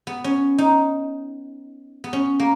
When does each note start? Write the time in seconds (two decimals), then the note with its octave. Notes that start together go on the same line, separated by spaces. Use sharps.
0.07 B3
0.24 C#4
0.58 D#4
2.04 B3
2.13 C#4
2.40 A#3